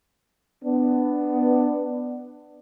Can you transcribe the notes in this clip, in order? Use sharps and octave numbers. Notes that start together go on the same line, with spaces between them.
B3 D4